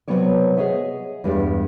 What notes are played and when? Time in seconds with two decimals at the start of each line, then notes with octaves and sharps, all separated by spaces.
0.08 C3 E3 F#3 B3 C#5 D5
0.57 G#4 A4 C#5 D#5 E5 F#5
1.24 E2 G2 G#3 A3 G4 D5